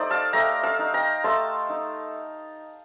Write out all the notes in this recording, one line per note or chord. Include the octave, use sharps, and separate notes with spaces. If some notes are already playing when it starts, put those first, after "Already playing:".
Already playing: A3 D#4 C5 D5
F5 A5
A3 G5 A#5
F5 A5
D#4
G5 A#5
A3 A5 C6
D#4